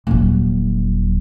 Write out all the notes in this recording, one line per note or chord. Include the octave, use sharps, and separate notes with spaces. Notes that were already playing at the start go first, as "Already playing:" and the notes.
D#1 F#3